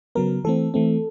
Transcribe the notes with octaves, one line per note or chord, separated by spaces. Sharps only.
C#3 F#3 B3 A#4
E3 A3 C4 A4
E3 A3 C4